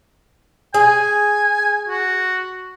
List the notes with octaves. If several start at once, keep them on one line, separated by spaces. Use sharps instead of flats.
G#4 G#5
F#4